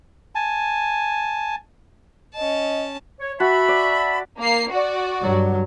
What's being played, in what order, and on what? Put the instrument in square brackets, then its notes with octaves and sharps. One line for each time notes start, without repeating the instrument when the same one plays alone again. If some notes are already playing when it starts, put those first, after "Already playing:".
[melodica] G#5 A5
[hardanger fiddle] C#4 A5 [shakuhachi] D#5
[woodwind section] C#5
[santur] F#4 [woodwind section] E5 A5 B5
[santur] D5
[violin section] A#3 C7
F#4 D5
[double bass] G2 F#3